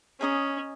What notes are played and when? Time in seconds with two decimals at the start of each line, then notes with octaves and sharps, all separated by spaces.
0.20 C#4 G#4 D#5 A#5 D#6